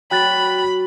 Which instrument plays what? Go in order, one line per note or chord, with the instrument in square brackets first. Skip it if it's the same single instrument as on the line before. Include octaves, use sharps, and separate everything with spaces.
[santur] F#3 [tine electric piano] G5 F#6 A6 [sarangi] B5